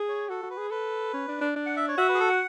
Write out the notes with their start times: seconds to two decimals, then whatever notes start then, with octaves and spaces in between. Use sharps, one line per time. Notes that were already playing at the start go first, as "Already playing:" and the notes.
Already playing: G#4
0.09 C#5
0.29 F#4 A4
0.43 F#4
0.50 B4
0.57 G#4
0.71 A4 B4
1.14 C#4
1.28 D4
1.41 D4
1.56 D4
1.66 F#5
1.76 E5
1.88 C#5
1.98 F#4 E5
2.09 B4
2.14 G#4
2.20 A4
2.29 F#5